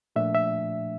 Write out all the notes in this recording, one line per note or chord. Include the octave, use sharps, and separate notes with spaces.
A#2 F3 A3 D4 E5
E5